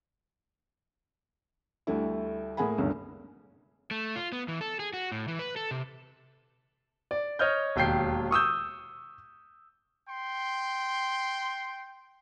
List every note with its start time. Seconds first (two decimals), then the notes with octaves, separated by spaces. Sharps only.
1.87 D2 G3 A3 E4
2.57 A2 A#3 G#4 F#5 G#5 B5
2.78 F#1 C#2 G2 B2 D3
3.91 A3
4.16 F4
4.32 B3
4.48 E3
4.61 A4
4.80 G#4
4.93 F#4
5.12 A2
5.28 E3
5.39 B4
5.56 A4
5.71 C3
7.11 D5
7.39 C#5 D#5 F6 G6
7.76 E1 D#2 G5 G6 C7
8.31 C#6 D#6 E6 G6
10.07 G5 C6